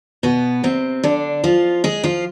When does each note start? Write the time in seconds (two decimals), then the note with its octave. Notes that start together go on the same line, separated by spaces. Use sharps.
0.23 B2 B3
0.64 C3 C4
1.03 D3 D4
1.44 F3 F4
1.84 G#3 G#4
2.04 F3 F4